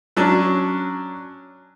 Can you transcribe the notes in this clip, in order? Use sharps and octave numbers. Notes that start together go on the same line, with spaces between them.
F#3 C#4 D4